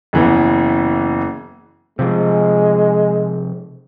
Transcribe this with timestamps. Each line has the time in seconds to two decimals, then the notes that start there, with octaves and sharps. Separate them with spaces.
0.13 F#1 E3 B3
1.99 C3 F3 G#3